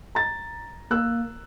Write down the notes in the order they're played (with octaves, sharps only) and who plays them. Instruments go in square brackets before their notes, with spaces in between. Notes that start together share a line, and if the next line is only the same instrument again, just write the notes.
[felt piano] A#5 A6
[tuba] A#3 [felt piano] A#4 E6 F#6